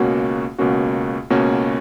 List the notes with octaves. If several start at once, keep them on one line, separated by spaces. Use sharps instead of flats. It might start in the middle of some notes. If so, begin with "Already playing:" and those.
Already playing: C#2 B2 A#3 C#4 F#4
C#2 B2 A#3 C#4 F#4
C#2 B2 A#3 C#4 F#4